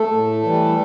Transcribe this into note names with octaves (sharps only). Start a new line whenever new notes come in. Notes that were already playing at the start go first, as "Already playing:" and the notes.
Already playing: A3 A4
A2
E3 G3